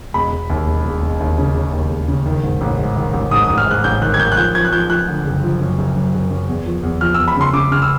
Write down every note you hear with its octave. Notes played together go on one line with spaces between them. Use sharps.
E1 B5
E1
D#2
E1
E1
E1
D#2
C#3
C#3
D#2
E1
C#3
D#3
G#2
A1
G#2
D#3
A1
G#2 D#6
D#6
A1
F6
G#2 F#6
A1 G6
D#3 F#6
G#6
D#3 G6
F#6
F3 G6
F3 G#6
F#6
F3 G6
F3 F#6
D3
F#1
F3
F#2
F#1
F#2
F#1
F#2
E2
F3
E2
F3 F6
E6
E2
B5
C#3 C6
C#3 D6
C#3 F6
E6